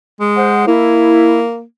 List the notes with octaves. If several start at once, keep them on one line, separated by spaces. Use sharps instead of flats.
G#3
C5 F#5
A#3 E4